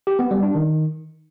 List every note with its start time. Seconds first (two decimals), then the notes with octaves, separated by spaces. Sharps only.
0.07 G4
0.19 B3
0.31 G3
0.43 D4
0.55 D#3